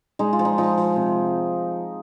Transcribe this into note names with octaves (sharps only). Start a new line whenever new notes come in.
G#3 D#4
F4
F3
D#4
F3 D#4
F3
C3